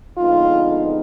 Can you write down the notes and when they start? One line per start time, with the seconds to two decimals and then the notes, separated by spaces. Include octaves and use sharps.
0.17 F2 D3 G#3 B3 D#4 F4